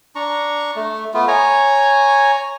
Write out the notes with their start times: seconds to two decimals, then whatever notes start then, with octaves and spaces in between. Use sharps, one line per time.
0.15 D4 A#5 C#6
0.76 A3
1.14 A3 B3 F4
1.28 C#5 G#5 A#5